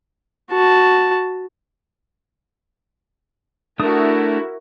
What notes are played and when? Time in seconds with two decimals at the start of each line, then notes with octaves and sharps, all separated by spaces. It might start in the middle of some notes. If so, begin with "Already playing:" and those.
0.51 F#4 A5
3.80 A3 D4 E4 F#4 A#4 D#6